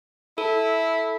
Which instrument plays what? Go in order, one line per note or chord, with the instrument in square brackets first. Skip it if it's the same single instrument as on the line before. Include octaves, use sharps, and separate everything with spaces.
[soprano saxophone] E4 [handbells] A4